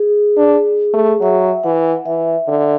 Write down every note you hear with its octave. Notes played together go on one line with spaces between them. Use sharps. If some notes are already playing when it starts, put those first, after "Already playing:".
Already playing: G#4
D4
A3
F#3 E5
E3 F#5
E3 E5
D3